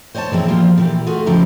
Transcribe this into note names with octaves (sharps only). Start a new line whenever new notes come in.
C5 C#5 D#5 F#5 A5
A#2 E3 G#3 C4 E4
F3 A#3 F4 G4
A#2 E3 G4
A3 F4 F#4 G#4
C#3 F3 E4 G4 A#5